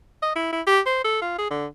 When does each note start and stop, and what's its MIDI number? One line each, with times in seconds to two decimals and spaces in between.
0.23 0.31 75
0.36 0.51 64
0.53 0.61 64
0.67 0.80 67
0.86 1.01 72
1.04 1.20 69
1.21 1.34 65
1.38 1.49 68
1.50 1.66 50